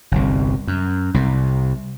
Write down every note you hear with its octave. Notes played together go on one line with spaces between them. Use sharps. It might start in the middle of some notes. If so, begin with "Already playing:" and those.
G1 C2
F#2
C2 C3